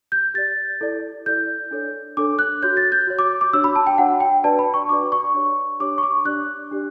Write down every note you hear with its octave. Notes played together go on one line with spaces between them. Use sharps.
G6
G4 D5 A6
E4 A4 D5
E4 A4 D5 G6
D4 A4 C#5
D4 A4 C#5 D6
F#6
F#4 C#5 G6
A6
G6
F#4 C#5
D6
D6
D4 F#4 C#5 E6
B5
A5
G5
D4 F#4 C#5 F#5
G5
D4 F#4 B4 D5 A5
B5
C#6
D4 F#4 B4 D5 D6
C#6
D4 G4 C#5
D4 G4 C#5 D6
C#6
D6
D4 G4 D5 F#6
D4 G4 D5